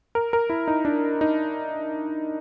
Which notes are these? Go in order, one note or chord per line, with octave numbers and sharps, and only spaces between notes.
A#4
A#4
E4
D#4
D4
D#4